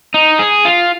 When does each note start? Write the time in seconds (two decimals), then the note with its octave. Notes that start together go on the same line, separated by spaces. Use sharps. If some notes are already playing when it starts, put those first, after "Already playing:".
0.14 D#4
0.39 G#4
0.65 F4